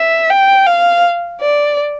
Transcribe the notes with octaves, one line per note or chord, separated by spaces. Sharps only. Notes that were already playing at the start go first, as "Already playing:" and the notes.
Already playing: E5
G5
F5
D5